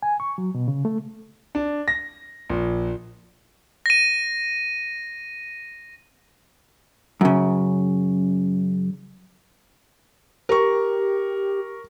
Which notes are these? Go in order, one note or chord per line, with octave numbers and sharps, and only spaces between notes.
G#5
C#6
F#3
B2
C#3
A3
D4
A#6
A#1
A#6 D#7
F#2 C#3
G4 A#4 C#6